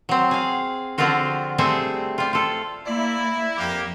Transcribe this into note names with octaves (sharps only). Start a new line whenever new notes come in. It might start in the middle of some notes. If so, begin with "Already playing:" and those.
F#3 C4
G#4 F5
D3 F3 C4 D4 F4 F#4
G3 A3 C4 G#4 E5
G3 F4
F4 A4
A#3 E4 D5
F2 A#3 G4